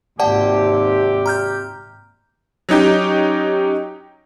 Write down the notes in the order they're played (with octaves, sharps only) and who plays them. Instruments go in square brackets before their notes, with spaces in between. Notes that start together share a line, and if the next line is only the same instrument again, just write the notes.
[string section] G#1 D#2 [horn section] C3 G4 [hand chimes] D5 [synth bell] F#5 G5 A5
[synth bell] A#5 F6 G6
[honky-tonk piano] F#3 C#4 D#4 G4